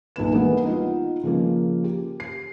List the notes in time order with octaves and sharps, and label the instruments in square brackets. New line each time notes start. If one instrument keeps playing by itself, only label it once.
[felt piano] B1 A#2 B4 E7
E3 G3 A#3 B3
B3 D#4 F4
C#3 F3 A#3
G4
C7